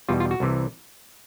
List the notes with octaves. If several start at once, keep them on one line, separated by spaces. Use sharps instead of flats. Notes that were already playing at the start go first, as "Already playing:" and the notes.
E2 B2 G3 F4
F4
F#4
C2 C3 E3